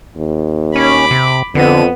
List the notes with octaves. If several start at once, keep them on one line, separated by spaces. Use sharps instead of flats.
D#2
C#4 B5 D6
C3
F2 D3 B3 D#7